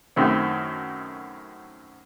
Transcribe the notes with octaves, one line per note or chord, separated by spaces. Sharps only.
F#2 A2 D#3 C4